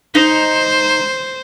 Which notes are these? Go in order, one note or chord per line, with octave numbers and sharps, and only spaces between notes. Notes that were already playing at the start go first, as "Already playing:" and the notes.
D#4 C5